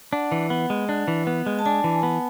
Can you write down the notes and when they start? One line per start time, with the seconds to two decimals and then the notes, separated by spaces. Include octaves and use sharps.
0.12 D4 F#5
0.32 E3
0.50 B3
0.70 G#3
0.89 D4
1.08 E3
1.27 B3
1.46 G#3
1.59 A5
1.66 D4 G#5
1.84 E3
2.03 B3